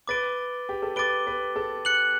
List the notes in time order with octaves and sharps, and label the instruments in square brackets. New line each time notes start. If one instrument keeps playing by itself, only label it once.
[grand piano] B4 [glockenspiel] D6 A6 D7 G7
[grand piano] G4
A4
[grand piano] B4 [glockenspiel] D6 A6 D7 G7
[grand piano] B4
A4
[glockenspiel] F#6 C#7 F#7